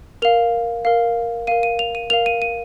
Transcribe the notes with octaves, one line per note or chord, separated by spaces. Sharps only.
A#4 F5 F7
A#4 F5
A#4 F5 D#7
D#7
F7
D#7
A#4 F5 F7
D#7
D#7